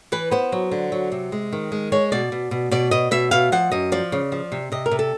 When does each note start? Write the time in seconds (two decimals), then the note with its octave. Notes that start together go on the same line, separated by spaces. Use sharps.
0.12 E3 B4
0.31 B3 C5
0.52 F#3
0.72 D3
0.92 F#3
1.12 C3
1.32 G#3
1.53 D#3
1.72 G#3
1.92 G#3 C#5
2.12 B2 D5
2.32 B2
2.51 B2
2.71 B2 D5
2.91 B2 D#5
3.11 B2 E5
3.31 B2 F5
3.52 F3 F#5
3.72 F#2 D#5
3.92 F3 D5
4.12 C#3
4.32 F3
4.52 C3
4.72 C3 D#5
4.86 A#4
4.91 C3
4.99 A4